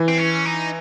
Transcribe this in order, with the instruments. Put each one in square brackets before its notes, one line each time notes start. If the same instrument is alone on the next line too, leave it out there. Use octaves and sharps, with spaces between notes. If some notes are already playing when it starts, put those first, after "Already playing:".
Already playing: [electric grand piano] E3
[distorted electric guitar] C4
C#4
D#4